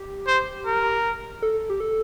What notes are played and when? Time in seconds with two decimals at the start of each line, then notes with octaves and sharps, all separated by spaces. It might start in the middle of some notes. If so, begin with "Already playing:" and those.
Already playing: G4
0.27 C5
0.66 A#4
1.42 A4
1.70 G4
1.80 A4